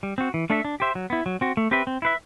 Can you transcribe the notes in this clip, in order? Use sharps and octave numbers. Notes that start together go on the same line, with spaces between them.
G3
C4 F#4
E3
A3 D4 A4 E5
D4
G4 C5 E5
F#3
B3 E4
F#3
C4 F#4
A3
C4 G4 B4 E5
C4
E4 B4 E5